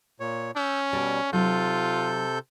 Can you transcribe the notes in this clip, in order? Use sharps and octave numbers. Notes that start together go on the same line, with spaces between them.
A#2 C#5
C#4 E6 G6
B2 G3 A4 D5
C3 F#3 D#4 F4 A4 G6